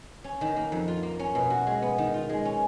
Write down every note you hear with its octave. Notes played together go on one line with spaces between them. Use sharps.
C#4
D#3
A#3
F2
F4
A#3
C#4
B2
F#4
G#3
B3
D#3
F4
G#3
C#4